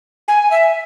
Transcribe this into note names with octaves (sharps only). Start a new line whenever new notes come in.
G#5
E5